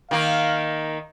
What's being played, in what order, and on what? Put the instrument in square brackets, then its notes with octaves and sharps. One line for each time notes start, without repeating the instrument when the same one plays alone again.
[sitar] D#3 A#3 [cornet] F5